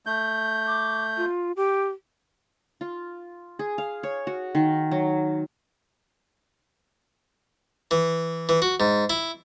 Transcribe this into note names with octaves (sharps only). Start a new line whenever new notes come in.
A3 G6
D6
F4
G4
F4
G#4
F5
C#5
F#4
D#3
F#3
E3
E3
F#4
G#2
E4